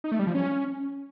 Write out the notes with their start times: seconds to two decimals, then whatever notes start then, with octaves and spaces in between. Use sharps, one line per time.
0.04 D#4
0.12 A3
0.19 G3
0.27 F3
0.35 C#4